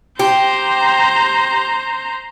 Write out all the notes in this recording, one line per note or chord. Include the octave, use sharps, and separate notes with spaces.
G4 C5 A#5